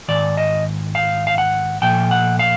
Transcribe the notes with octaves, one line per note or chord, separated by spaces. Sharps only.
G#2 D#3 D5
D#5
F5
F5
F#5
A#2 F3 A3 G5
F#5
F5